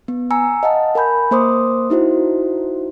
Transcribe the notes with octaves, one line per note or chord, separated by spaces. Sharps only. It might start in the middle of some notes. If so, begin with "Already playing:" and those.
B3
G#5 A#5 E6 C#7
D#5 F5 F#5 A5
A#4 G#5 B5 G6
A#3 A#4 C5 C6 D6 D#6
D#4 E4 F#4 C5